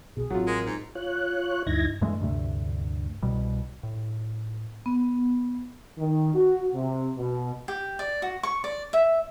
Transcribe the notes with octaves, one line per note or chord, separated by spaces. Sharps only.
B1 B2 G#4
A1 F#3 C4 F4
G#3 A#4
G#2
F4 C#5 F#6
D2 G2 D#4 E4 G#6 A#6
G2 E3 G#3 A3
D2 G2 C3 A3
C2 B2 G3
A2
B3
D#3
F#4
C3
B2
G4
D5
F#4
C#6
D5
E5